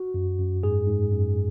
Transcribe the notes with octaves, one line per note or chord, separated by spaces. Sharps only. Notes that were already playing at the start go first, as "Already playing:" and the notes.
Already playing: F#4
F#2
F#2
G#2 G#4
G#2
F#2